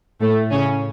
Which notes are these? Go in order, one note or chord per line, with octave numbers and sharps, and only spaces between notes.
A2 A3
C#3 C#4